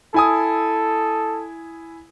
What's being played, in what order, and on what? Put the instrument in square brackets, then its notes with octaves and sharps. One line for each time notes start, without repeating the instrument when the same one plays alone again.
[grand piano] E4 G#5 D#6 [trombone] A4